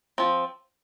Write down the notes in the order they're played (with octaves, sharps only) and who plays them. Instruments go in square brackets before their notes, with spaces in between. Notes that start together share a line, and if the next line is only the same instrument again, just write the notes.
[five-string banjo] F3 C4